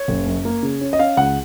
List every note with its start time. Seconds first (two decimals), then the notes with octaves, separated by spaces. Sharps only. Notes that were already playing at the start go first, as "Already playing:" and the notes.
Already playing: C#5
0.08 F#1
0.26 F#2
0.45 A#3
0.63 C#3
0.81 C#4
0.93 D#5
0.99 C#4 F5
1.17 C#2 F#5